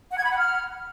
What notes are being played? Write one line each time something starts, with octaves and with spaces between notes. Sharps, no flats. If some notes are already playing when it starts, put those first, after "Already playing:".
F#5
G#6
B5
F#5
F6